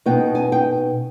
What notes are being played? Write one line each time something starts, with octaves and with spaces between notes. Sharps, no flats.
B2 B3 D#4 G5
G#5
G5